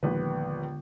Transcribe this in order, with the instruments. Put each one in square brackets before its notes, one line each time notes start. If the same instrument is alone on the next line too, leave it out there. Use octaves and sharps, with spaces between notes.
[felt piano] A#1 D#2 B4 [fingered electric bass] D3 G#3 B3